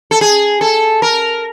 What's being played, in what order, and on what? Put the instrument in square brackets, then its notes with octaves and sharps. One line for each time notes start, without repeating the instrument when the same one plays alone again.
[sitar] A4
G#4
A4
A#4